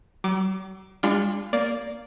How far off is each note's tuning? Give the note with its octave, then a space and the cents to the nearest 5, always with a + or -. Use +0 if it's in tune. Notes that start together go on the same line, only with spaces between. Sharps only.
F#3 +45 D6 +0
G#3 -45 D4 +0 F4 +0
A#3 +0 D5 -10